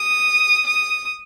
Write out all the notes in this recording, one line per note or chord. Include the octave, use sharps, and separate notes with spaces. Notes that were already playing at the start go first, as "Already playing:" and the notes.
Already playing: D#6
D#6